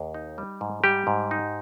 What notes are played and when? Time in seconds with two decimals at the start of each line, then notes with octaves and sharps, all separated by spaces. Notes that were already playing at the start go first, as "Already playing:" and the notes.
Already playing: D#2
0.14 D#4
0.38 G3
0.61 G#2
0.84 G3 G4
1.07 G#2
1.31 D#4